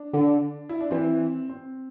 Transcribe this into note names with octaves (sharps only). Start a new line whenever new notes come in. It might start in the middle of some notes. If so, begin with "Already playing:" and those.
Already playing: D4
D3
E4
D4
E3 C4
C4